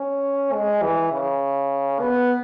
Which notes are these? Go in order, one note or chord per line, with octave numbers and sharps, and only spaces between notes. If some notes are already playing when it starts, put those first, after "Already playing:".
Already playing: C#4
G#3
E3
C#3
B3